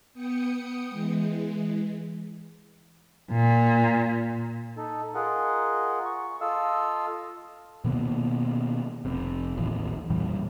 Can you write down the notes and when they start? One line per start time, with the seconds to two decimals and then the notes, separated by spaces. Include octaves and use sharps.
0.14 B3 G5 D#6 C#7
0.89 E3 G#3
3.30 A#2
4.77 D#4 A4
5.15 F4 G#4 A#4 D#5 F#5
6.05 C#6
6.41 F4 A4 D#5 F5 E6
7.84 B2 D#3 A#3 B3
9.05 F1 C3
9.57 A1 D#2
10.10 F2 A#2 E3 G3